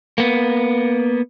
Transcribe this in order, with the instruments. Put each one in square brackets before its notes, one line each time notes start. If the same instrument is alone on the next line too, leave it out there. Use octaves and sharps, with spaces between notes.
[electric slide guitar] A#3 B3